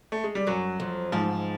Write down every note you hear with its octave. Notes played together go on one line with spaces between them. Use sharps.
A3
G#3
G3
F#2 F#3
F2
G#2 F3